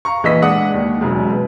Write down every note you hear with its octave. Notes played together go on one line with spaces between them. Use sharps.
F5 A#5 C#6
A#1 E3 B4 D#5 E6 B6
G#3 D4 F#5 D#6
D#2
E1 F#2 G#3
B4